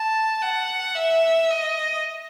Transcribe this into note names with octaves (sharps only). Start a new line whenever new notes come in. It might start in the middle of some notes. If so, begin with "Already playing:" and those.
Already playing: A5
F#5
E5
D#5